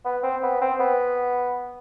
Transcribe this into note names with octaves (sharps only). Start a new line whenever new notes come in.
B3
C4
B3
C4
B3